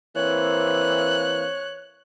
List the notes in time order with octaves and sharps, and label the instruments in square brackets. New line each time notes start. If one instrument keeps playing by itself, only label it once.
[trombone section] E3 A#3 C4 [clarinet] C#5 [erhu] F#6